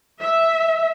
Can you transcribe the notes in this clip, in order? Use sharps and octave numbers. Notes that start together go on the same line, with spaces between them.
E5